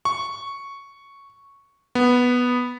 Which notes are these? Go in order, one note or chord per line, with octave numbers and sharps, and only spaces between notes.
C#6
B3